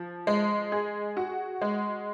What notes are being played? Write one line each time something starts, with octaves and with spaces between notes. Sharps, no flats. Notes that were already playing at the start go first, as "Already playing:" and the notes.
Already playing: F3
G#3
G#4
F#4
G#3